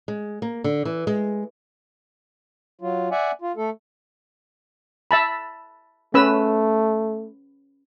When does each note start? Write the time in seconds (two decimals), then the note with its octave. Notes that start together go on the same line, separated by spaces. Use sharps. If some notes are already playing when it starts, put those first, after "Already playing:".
0.08 G#3
0.42 A#3
0.64 D3
0.85 E3
1.07 G#3
2.81 F#3 F4
3.11 D5 E5 F#5 G#5
3.42 F4
3.57 A3 A4
5.11 E5 A5 B5
6.14 A3 C#4 B4 E6